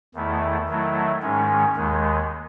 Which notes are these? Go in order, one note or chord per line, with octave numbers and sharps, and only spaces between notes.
E2 D#3 A3 E4
D#3 F#3 A3 E4
G#2 D#3 G#3 C#4
D#2 D#3 G#3